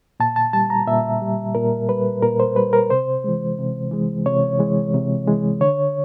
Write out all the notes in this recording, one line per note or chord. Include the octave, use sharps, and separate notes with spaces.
A#2 A5
A5
G3 A5
A#5
A#2 E5
G3
A#2 A#4
G3 B4
A#2 A#4
C5
G3 B4
A#4
C3 C5
E3 G#3
C3
E3 G#3
C3 C#5
E3 G#3
C3
E3 G#3
D3 C#5